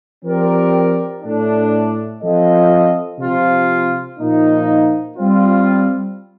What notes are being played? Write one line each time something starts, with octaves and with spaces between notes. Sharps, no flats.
F3 C4 G4 A#4 D5
A2 A3 D4
F3 C4 F4 A4 D#5
C3 F3 C4 F4
A#2 F3 A#3 D#4
G3 C4 F4